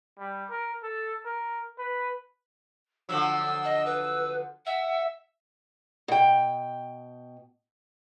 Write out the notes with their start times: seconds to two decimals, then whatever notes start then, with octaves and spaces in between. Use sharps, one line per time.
0.19 G3
0.50 A#4
0.83 A4
1.25 A#4
1.78 B4
3.09 D3 F3 F#3 E6
3.65 D#5
3.86 B4
4.66 E5 F#5
6.08 B2 G5